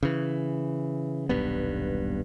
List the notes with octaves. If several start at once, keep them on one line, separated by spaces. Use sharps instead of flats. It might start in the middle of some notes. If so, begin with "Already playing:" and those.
C#3 E3
D#1 B1 G2 B3